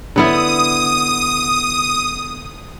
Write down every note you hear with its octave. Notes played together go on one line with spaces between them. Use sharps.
D3 B3 E4 D#6